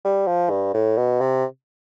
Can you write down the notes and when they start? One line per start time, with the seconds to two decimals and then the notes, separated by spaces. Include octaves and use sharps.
0.05 G3
0.27 F3
0.50 G2
0.74 A2
0.97 B2
1.21 C3